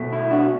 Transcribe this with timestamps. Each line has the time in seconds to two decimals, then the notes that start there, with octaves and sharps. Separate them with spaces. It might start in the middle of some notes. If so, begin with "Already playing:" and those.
Already playing: B2 A3
0.13 E4
0.31 D4 F#4